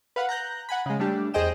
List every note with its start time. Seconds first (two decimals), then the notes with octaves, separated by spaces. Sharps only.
0.16 B4 F5 F#5 B5
0.29 A#5 F#6 G6 A#6
0.69 F#5 G#5 B5
0.86 C#3 G#3
0.99 G3 A3 D4 G4
1.34 E2 G#4 C5 D#5 G5 E7